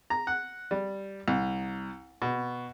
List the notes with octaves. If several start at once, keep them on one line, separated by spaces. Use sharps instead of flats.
A#5
F#5
G3
C2
B2